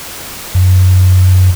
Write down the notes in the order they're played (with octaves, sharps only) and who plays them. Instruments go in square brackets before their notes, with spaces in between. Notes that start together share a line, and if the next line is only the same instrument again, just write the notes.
[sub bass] F#2